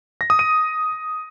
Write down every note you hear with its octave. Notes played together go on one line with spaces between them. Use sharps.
A#6
D#6
D#7